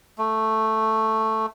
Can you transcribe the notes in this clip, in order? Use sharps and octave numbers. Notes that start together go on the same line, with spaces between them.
A3